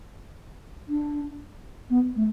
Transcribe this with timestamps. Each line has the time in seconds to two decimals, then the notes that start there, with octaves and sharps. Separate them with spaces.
0.89 D4
1.90 B3
2.16 A3